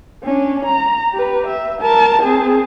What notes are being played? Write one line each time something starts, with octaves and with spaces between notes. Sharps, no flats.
C#4 D4
A#5
G4 B4
E5
A#4 A5
C4 G#4